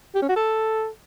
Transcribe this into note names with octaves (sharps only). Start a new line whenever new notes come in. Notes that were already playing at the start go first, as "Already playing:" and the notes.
G4
C#4
F#4
A4